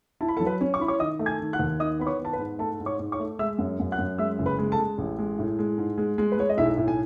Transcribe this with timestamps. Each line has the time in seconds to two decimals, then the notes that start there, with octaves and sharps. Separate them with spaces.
0.21 E4 A5
0.28 B5
0.37 A4 A5
0.40 F#3
0.46 B4 B5
0.61 C#4
0.74 C#6
0.79 E4 B5
0.88 C#5 C#6
0.99 D#3 D#5 D#6
1.19 A3
1.26 G#5 G#6
1.40 D#3
1.53 F#5 F#6
1.59 D#2
1.80 D#3 D#5 D#6
1.99 B3 B5
2.06 C#5 C#6
2.19 B3
2.25 A5
2.33 B4 B5
2.39 G#2
2.59 A3 A4 A5
2.80 G#2
2.86 C#5 C#6
2.99 G#2
3.12 C#5 C#6
3.19 A3
3.39 G#3 E5 E6
3.58 F#2
3.80 F#2
3.92 F#5 F#6
3.98 F#2
4.18 G#3 E5 E6
4.39 F#1
4.46 B4 B5
4.59 G#3
4.72 A4 A5
4.78 G#3
4.98 A1
5.19 G#3
5.39 A2
5.59 G#3
5.78 G#2
5.98 G#3
6.18 G#3
6.32 B4
6.38 G#3 C#5
6.49 D#5
6.57 B1 E4 E5
6.77 A2
6.88 G#5